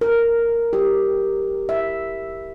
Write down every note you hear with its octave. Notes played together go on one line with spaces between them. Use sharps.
A#4
G4
E5